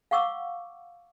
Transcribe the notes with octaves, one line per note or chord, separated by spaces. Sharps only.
F5 F#5 C#6 D6 E6